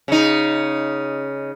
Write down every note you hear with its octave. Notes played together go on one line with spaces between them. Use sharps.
C#3 D#4